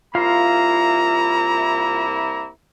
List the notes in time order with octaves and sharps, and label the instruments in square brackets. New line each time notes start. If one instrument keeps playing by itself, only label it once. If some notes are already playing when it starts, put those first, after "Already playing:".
[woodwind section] C2 A#3 E4 [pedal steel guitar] F4 F5 C6 [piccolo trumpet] A#5